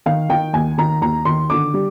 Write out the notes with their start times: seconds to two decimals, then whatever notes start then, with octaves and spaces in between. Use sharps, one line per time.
0.06 D#3 F5
0.29 D#3 G5
0.53 D#2 G#5
0.78 D#3 A#5
1.02 D#2 A#5
1.25 D#3 C6
1.50 D3 D6
1.74 G3